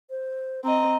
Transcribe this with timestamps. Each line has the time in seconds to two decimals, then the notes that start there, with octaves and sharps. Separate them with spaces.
0.10 C5
0.64 C4 D#5 A#5